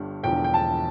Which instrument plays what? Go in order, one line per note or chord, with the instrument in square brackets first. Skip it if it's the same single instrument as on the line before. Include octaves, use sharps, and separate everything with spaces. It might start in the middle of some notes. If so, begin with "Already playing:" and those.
Already playing: [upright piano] G1 G2 D3 G3
E1 E2 D3 F3 G5
G5
A5